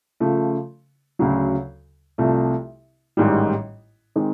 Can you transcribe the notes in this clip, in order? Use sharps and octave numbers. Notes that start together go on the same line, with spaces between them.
C#3 F3 A3
D2 C#3 F#3
C2 C3 F3 A3
A1 G#2 D#3 G3
D#3 G#3 C4